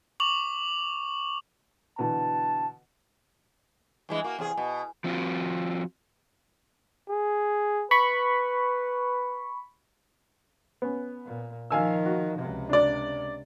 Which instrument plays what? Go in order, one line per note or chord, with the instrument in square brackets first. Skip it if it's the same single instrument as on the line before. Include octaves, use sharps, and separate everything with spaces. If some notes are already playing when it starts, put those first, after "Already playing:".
[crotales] C#6 D6 F7 F#7
[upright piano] B2 D3 E3 [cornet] A5
[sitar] G2 E3 G#3
A#3 F#4
E2 C3 G#4
B2
[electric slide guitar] F3 C4 F4 F#4
[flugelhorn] G#4
[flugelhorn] B4 [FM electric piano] B5 C#6
[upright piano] B3 C#4
[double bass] A#2
[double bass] D#3 F3 [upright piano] F5 G#5 E6
[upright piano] F#4
[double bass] C#2 C3
[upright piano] D4 D5